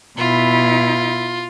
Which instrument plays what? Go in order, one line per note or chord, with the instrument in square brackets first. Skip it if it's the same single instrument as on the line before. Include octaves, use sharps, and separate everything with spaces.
[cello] B2 E4 [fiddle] F4